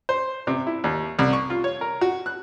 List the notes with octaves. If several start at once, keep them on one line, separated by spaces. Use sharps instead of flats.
C5
C3
E4
D#2
C2
C#6
F4
C#5
A#4
F#4
F#6